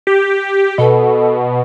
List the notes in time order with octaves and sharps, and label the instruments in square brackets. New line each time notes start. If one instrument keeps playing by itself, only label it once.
[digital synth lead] G4
[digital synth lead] B2 [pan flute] A4